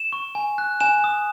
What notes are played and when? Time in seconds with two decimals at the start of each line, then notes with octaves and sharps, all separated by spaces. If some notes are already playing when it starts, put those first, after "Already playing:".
Already playing: E7
0.13 C#6
0.35 G#5
0.58 F#6
0.80 G#5 E7
1.04 D#6